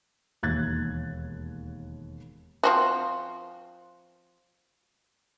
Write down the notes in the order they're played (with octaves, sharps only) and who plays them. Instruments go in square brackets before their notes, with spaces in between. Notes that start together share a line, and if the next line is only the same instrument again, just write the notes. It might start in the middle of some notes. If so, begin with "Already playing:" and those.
[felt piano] E1 D#2 F#6 G#6 A6
[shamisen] F3 C4 F#4